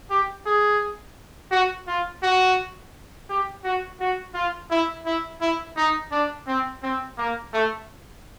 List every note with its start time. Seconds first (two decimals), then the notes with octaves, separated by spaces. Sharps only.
0.10 G4
0.46 G#4
1.51 F#4
1.87 F4
2.23 F#4
3.29 G4
3.64 F#4
4.00 F#4
4.34 F4
4.70 E4
5.06 E4
5.41 E4
5.76 D#4
6.11 D4
6.47 C4
6.83 C4
7.18 A#3
7.53 A3